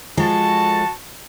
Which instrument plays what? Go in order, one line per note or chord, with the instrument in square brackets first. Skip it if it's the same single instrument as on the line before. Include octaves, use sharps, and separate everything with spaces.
[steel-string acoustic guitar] F3 G#3 A4 [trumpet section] F#4 A5